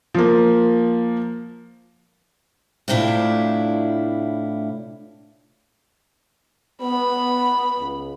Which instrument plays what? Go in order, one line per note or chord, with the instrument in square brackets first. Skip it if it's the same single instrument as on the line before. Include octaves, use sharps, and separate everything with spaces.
[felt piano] F3 A#3
[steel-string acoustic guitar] A2 C3 A3 D4 E4 F4
[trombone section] B3 [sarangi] B5
[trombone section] C#2